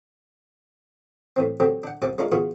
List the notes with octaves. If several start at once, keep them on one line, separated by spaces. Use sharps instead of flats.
A2 E3 C4
F#3 A3 C4 G4
D4 F#5
C2 F#2 C3 E5 A5 D6
G#3 C#4 D4 F4 A#4 D5
C#3 E3 B3 F4 F#4 G#4